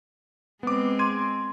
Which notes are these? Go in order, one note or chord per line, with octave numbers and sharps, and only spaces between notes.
G#3 B3 C4 D6
C6 G#6 D#7